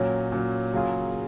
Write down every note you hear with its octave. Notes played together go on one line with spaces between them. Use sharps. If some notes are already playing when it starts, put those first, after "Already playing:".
Already playing: A#2 F#3 C#4
A#2 F#3 C#4
C#3 F#3 A#3 F4 G#4